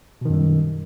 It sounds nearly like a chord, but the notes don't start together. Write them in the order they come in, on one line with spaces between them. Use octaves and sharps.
B2 D#3 F#2 G3